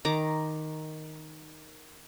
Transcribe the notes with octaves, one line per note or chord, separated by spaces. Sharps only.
D#3 A#5 D6